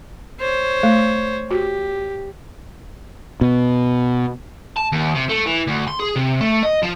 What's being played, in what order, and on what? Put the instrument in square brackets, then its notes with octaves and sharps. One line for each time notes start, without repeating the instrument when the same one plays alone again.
[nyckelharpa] C5 C#5
[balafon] A3
[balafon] F#4 [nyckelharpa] G4
[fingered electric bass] B2
[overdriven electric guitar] A5
D#2
C3
A3
E3
D2
C6
G#4
C3
A3
D#5
F3